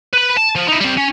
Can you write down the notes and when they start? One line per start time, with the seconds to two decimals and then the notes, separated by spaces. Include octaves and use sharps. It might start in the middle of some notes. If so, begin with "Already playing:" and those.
0.13 B4 B5
0.37 A5
0.55 F3
0.68 D#4 E4
0.80 G3 C4
0.97 C#4